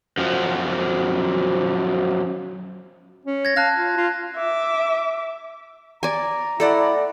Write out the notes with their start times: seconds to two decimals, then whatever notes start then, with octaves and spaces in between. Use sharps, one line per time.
0.18 F#2 F3
3.25 C#4
3.45 G#6 A#6
3.56 F5 A5 F#6 A#6
3.76 F4
3.97 F4
4.36 E5 D6
6.03 D5 G#5 A#5
6.60 A3 E4 A4 D5 F#5